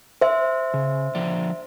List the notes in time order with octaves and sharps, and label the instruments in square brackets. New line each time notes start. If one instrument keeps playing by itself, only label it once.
[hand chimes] C5 E5
[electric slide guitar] C#3
D3 F3 D5